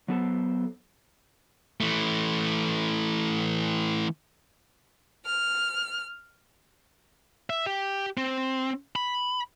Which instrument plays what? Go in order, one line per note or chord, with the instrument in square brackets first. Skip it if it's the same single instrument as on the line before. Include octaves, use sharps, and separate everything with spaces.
[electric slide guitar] F#3 B3 A4 C5
[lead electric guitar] E3 A3
[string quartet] F6
[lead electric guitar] E5
G4
C4
B5